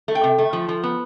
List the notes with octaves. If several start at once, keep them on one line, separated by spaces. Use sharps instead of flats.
A3
G5
C3
A3
F3
F3
B3